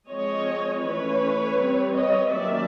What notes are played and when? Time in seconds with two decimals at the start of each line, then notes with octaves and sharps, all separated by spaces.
0.09 F3 G#3 C4 C#5 D#5
0.83 E3 A3 C#4 B4 C#5
1.58 G3 C4
1.95 C#5 D#5
2.32 D#3 F#3 A#3 C#4 D5 E5